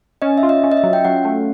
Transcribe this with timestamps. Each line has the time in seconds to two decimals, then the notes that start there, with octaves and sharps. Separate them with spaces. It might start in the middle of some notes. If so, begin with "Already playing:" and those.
0.22 C#4 D#5
0.38 E5
0.43 F4
0.49 D#5
0.64 C#4
0.72 D#5
0.77 E5
0.84 F#3
0.93 G5
1.05 F#3 F#5
1.25 A3